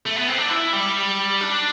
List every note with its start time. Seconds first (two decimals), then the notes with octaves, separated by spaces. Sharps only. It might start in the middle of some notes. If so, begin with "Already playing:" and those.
0.06 A3
0.16 B3
0.28 C4
0.38 D4
0.49 E4
0.73 G3
1.41 D4